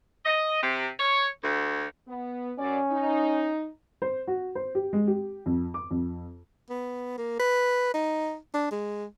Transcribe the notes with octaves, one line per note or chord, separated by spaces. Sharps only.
D#5
C3
C#5
D2
B3
F#2 C#4 D5
D#4
C5
F#4
C5
G4
G#3
G4
F2
D6
F2
B3
A#3
B4
D#4
D4
G#3